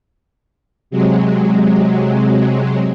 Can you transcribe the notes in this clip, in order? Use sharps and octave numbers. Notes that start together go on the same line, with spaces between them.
C3 F#3 G#3